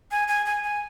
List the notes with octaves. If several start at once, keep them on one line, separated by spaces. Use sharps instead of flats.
G#5
G#5
G#5
G#5